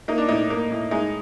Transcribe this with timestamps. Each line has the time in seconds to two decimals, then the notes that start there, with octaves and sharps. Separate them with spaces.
0.08 A#3 D#4
0.18 D4
0.28 A2 D#4
0.50 A#3
0.70 A2
0.91 G#3 D#4